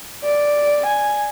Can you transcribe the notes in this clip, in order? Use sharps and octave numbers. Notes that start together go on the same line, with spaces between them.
D5
G#5